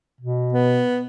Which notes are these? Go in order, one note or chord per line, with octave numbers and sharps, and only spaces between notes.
B2
B3